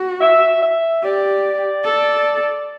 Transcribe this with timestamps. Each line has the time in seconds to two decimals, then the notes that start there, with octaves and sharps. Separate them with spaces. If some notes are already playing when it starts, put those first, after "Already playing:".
Already playing: F#4
0.21 E5
0.62 E5
1.03 G4 D5
1.84 A4